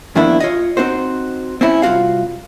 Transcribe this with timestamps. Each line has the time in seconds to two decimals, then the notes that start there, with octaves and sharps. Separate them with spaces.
0.15 F2 D#3 A#3 B3 D4 E4
0.40 F4 C#5 D#5
0.77 C4 D#4 F#4 C5
1.61 C4 C#4 E4
1.82 C2 F2 F4 F#4 F5